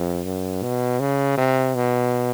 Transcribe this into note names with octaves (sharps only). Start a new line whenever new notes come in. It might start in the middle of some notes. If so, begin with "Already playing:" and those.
Already playing: F2
F#2
B2
C#3
C3
B2